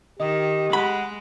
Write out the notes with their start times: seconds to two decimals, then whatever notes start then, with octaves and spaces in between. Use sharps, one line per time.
0.19 D#3 G4 D#5
0.73 G#3 F#5 B5